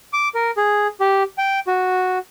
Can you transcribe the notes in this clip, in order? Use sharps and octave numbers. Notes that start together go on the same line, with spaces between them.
D6
A#4
G#4
G4
G5
F#4